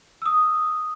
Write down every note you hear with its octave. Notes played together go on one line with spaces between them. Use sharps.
D#6 E6